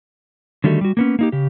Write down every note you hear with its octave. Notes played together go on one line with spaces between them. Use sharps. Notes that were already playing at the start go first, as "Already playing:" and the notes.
D3 D#3 G3 A3 F#4 A4
G3 F#4
A#3 B3 C#4
A#3 D#4 G4
C#3 G4